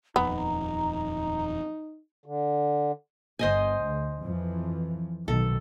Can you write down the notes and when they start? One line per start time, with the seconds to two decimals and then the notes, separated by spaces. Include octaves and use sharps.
0.16 D#1 F2 B3 D#4 A#5
2.26 D3
3.39 G1 C5 D#5 G#5
3.81 D2
4.21 F2 E3 F3
5.28 B1 D#3 A4